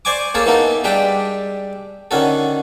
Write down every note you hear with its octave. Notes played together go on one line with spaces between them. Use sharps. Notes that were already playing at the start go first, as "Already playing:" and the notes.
C5 D5 G#5 C#6 D6
A#3 G#4 A4 C#5 A5
E3 A#3 B3 D#4 A4 A#4
G3 G#3 D4 E5 G5
D3 D#3 C#4 F#4 A4